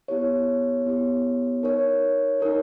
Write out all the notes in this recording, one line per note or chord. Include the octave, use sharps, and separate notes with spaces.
B3 E4 G4 C#5
B3 E4 G4 C#5
D#4 A#4 C#5
D#4 A#4 C#5